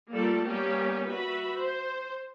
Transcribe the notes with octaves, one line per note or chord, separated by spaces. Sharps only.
G3 A3 A#3 F4 A4 D5
G3 A#3 B3 C#4 G4
F#4 B4 E5 B5
C5